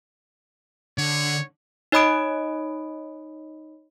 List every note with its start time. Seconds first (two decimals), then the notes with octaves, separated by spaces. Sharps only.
0.98 D3 C#5
1.92 D#4 C#5 D#5 B5 D#6 D7